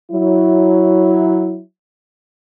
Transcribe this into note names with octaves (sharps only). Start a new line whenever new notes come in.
F#3 E4